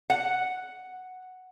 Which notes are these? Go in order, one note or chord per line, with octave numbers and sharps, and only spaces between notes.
F#5